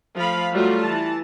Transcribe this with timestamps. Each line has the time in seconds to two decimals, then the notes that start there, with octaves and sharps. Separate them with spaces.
0.16 F3 A3 F5 B5
0.53 F#3 G3 A3 F4 F#4
0.81 E3 A5